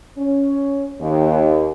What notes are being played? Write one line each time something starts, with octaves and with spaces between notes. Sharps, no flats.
C#4
D#2